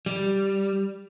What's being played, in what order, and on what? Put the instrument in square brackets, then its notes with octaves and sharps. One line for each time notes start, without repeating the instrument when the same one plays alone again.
[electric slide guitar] G3